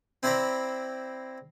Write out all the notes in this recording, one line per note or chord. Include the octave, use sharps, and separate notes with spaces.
C4 E4 C5 D5 A#5 B5